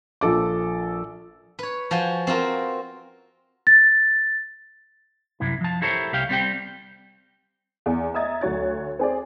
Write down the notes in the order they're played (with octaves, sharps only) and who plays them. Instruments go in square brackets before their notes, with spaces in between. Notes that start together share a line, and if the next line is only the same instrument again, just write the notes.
[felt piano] A#1 F3 A4 D6
[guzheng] B4 C#5
F3 F#4 G5 G#5
C4 F4 F#4 A#4
[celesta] A6
[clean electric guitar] C2 F#2 C3 E4
F3 A5
E4 G4 A4 A#4 C5 C#5
C2 G4 F5 G5
G3 C4 G4 G5
[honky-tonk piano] E2
D#5 E5 A#5 D#6 G#6 A6
D2 F#3 F#4 C#5 A6
C4 G#4 D5